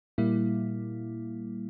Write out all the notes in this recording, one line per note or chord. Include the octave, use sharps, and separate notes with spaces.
A#2 G3 A#3 E4